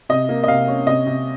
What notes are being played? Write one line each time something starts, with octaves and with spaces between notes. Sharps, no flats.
C3 D#5
A#3
D#5
C3 F5
C#4
C3 D#5
C3